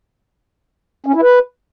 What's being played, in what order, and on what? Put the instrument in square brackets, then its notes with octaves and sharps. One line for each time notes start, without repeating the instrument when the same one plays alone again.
[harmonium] C#4
E4
B4